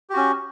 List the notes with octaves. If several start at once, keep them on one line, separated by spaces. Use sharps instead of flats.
C#4 F#4 G4